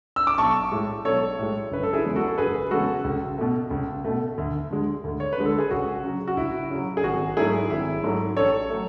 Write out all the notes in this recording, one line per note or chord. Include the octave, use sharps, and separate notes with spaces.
E6
D6
B1 A5 C#6
A2 G#3
B1 A4 C#5
A2 G#3
F#1 B4
A4
E4 G#4
E2 C#3 G#3
F#4 A4
A4
F#1 G#4 B4
E2 C#3 G#3 F#4 A4
C#2
B2 A3
C#2
B2 A3
D2
D3 G#3
D2
C#5
B4
D3 G#3
A4
G#4
C#2 F#4
C#3 F#3
F#4
C#2 E4
C#3 F#3
G#4
G#1 F#4
G#2 F#3 A3 E4 G#4
G#1 E4
G#2 F#3 A3
A1 A4 C#5
F#3 A3